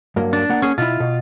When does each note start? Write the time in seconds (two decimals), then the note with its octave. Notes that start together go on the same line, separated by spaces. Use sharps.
0.16 G2 F#3 A#3
0.33 D4
0.50 A#3 F#5
0.62 C#4 G#4
0.78 B2 E4 F4
1.00 B2